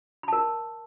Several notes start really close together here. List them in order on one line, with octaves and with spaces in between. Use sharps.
B5 A5 A#4